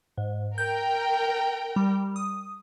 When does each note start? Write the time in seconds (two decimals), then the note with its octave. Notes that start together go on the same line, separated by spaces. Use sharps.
0.18 G#2
0.58 A#4 G5 G6
1.76 G3
2.16 D#6